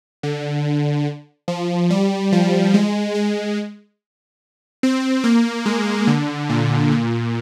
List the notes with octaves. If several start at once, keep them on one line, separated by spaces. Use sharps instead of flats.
D3
F3
G3
F3
G#3
G#3
C4
A#3
G#3
D3
A#2
A#2